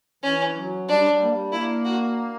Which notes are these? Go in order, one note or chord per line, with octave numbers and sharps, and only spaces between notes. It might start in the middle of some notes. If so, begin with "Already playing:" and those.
E3 C#4
F#3
G3 D4
F#3
G3
A#3
G3
A#3 E4
F#4